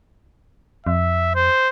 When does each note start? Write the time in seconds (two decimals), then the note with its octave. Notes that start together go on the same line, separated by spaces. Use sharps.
0.87 F2 E5
1.35 C5